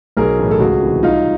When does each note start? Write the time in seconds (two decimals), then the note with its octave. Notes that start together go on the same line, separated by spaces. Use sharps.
0.17 B1 G#4 A#4
0.38 A2 E3
0.51 A4
0.60 C#2 F#4 G#4
0.82 C3 E3
1.03 C2 D#4 F4